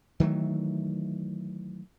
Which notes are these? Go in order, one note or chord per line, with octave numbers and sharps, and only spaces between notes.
D#3 E3 F#3 A3